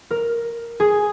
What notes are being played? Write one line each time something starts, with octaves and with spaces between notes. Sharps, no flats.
A#4
G#4